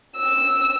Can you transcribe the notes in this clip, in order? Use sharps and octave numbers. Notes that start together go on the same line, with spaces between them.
E6